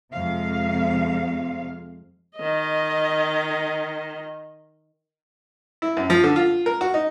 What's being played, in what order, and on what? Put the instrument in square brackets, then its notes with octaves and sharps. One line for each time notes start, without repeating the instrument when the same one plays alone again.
[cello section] F2 C3 G#3 F5
[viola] D#3 D#5
[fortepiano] E4
F#2
F3
D3
F4
A#4
F#4
D#4